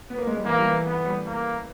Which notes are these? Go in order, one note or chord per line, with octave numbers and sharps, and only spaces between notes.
B3
A#3
G#3
G3
E3 A#3
G3
E3
B3
G3
A#3